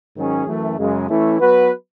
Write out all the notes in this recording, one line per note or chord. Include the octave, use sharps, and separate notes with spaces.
G#2 D#3 F#3 C#4 G#4
F#2 E3 A3
F#2 C#3 G#3
E3 A3 C#4 E4
F#3 B3 F#4 B4